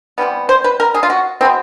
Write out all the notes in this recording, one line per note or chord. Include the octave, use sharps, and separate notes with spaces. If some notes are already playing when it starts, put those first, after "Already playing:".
C3 E3 G3 B3
C5
B4
A#4
G#4
F4
F#4
B2 G#3 B3 C4